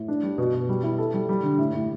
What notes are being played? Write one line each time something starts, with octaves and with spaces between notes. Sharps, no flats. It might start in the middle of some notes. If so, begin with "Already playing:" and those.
Already playing: A2
D4
G3
B2
B2
G3
E4
A4
G3
G3
D3
A2
A2